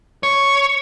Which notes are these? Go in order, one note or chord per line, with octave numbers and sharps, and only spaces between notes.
C#5